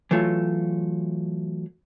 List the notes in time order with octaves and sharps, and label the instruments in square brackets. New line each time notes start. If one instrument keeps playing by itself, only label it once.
[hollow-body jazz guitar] E3 F#3 A3 F4